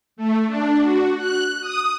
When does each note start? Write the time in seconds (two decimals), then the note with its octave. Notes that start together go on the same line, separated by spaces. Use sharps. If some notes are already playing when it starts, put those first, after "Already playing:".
0.17 A3
0.47 D4
0.80 F#4
1.18 F#6
1.61 D#6